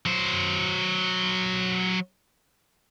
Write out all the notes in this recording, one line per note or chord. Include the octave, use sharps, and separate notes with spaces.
F#3 C5